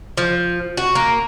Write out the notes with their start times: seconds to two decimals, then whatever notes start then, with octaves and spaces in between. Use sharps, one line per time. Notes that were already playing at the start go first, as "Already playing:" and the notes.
0.17 F3
0.77 F#4
0.95 A#3